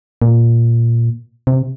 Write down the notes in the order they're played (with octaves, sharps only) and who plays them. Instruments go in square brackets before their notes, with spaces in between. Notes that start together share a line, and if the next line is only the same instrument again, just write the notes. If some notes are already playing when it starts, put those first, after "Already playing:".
[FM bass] A#2
C3